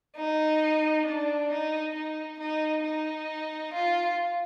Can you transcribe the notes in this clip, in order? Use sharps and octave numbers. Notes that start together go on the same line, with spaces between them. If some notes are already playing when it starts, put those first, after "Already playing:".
D#4
D4
D#4
D#4
D#4
D#4
F4